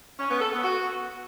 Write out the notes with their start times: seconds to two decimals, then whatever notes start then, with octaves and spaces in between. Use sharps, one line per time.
0.18 C#4
0.29 B3
0.41 A4
0.52 B3
0.64 F#4